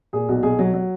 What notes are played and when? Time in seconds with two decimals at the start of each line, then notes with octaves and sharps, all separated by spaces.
0.13 A#2 G#4
0.29 B1 F#4
0.43 B1 G#4
0.59 F#3
0.74 F#3